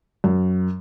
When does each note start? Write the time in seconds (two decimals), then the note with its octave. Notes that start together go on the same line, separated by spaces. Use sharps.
0.24 F#2